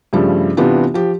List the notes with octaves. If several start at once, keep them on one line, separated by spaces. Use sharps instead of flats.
G2 C#3 F3 G3 A3
C3 E3 B3 D4 F4 G4
F3 G4